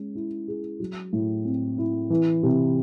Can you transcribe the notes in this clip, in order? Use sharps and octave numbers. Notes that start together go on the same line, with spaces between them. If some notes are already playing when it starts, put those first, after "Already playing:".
Already playing: G#3 C#4
E4
G#4
F#3
A2
C4
E4
E3
C3